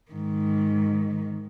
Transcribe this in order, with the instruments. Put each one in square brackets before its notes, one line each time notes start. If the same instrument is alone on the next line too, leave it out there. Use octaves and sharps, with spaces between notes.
[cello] G#2 D#3